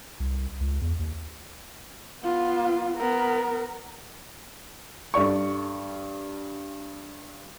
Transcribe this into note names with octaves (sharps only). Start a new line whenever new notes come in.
C2
C#2
E2
D#2
B3 F4
B3 A#4
G2 A4 D5 C#6